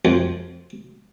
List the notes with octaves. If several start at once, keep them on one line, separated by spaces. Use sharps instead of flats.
F2